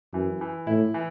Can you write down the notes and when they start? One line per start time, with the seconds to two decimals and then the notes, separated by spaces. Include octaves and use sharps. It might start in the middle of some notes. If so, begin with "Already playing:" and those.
0.13 F#2 E3
0.41 E3
0.67 A2 E4
0.94 E3